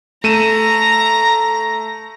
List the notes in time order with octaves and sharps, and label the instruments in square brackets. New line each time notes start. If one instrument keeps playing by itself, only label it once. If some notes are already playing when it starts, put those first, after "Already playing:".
[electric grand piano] A3 D#7 E7 [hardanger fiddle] A#5